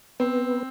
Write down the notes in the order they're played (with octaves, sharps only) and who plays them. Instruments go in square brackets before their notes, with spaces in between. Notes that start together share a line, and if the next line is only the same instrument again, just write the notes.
[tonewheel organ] B3 [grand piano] C4